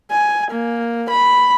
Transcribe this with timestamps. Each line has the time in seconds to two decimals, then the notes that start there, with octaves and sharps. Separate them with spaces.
0.12 G#5
0.51 A#3
1.11 B5